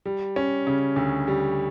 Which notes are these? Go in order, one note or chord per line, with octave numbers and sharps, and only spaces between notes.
G3
C#4
C#3
D2
G3